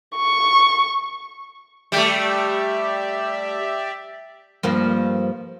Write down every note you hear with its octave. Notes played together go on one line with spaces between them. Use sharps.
C#6
G3 A3 G4 D5 E5
G2 F3 A#3